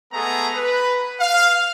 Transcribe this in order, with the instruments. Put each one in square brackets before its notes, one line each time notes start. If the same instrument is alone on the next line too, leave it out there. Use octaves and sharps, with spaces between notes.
[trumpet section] G#3 A3 B3 G#4 A4 A#5
B4
F5